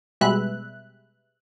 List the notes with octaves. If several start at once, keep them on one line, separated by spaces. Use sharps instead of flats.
B2 G3 G#3 B4 E5 F#6